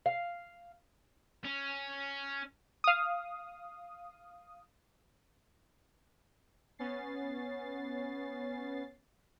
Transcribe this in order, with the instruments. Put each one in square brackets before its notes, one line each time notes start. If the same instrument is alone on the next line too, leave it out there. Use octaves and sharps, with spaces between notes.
[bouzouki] F5
[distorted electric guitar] C#4
[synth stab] F5 D#6
[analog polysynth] B3 C#4 A6 C7